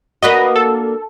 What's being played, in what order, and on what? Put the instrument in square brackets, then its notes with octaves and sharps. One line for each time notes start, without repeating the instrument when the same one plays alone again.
[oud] A#3 D4 F#4 [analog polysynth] B4 D#5
[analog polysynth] A4